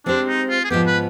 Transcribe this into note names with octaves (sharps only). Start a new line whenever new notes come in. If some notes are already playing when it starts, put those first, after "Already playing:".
G#3 C4 D4 G4 C5
D#4
F4
G#4
G#2 F3 G#3 B3 G4
B4